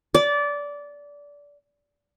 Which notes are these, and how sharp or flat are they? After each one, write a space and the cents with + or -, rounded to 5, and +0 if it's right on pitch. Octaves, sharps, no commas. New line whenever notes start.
D5 -20